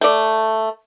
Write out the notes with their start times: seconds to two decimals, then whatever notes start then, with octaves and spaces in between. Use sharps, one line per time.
0.01 A3 D5